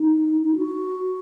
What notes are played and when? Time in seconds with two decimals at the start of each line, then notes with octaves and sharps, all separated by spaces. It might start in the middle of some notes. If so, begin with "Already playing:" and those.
Already playing: D#4
0.44 D#4
0.56 F#4